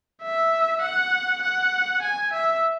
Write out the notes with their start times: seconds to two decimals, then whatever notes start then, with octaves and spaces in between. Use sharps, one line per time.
0.22 E5
0.81 F#5
1.42 F#5
2.02 G#5
2.33 E5